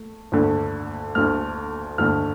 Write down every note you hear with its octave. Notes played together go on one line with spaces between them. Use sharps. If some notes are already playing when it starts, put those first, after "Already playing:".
Already playing: A3
D2 D3 A3
D2 D3 A3 F6
D2 D3 A3 F6